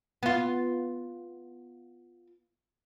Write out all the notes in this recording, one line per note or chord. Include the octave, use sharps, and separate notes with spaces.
B3 F4